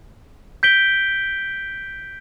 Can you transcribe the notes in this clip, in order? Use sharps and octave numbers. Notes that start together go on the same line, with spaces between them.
G6 B6 D7 G7